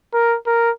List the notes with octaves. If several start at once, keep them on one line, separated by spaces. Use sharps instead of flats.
A#4
A#4